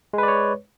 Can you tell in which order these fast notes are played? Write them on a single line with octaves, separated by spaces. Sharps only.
G#3 B4 D5 C#5